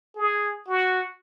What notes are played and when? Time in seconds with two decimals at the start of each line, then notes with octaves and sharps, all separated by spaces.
0.16 G#4
0.68 F#4